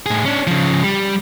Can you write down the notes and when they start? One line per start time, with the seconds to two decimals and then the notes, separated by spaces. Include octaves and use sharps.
0.06 A2 G#4
0.25 C#4 D4
0.47 C#3 F3
0.84 G3